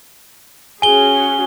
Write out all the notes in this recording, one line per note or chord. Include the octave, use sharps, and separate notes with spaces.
C#4 F#4 G#4 G#5 G7